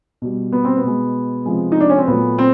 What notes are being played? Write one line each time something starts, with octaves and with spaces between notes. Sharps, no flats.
B2 G3
B3
C4
B3
B2 G#3
C3 F3 G#3
D#4
D4
C#4
C4
A#2 F#3 A3 B3
C4